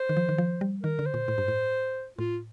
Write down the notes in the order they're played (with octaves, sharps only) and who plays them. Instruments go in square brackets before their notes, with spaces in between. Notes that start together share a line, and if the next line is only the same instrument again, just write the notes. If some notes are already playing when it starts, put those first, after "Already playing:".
Already playing: [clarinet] C5
[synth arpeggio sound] D#3
F3
D#3
F3
G3
[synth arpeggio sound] D#3 [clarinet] A#4
[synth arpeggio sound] D3
[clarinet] C5
[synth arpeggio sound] A#2
A2
G2
A2
[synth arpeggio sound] A2 [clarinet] F4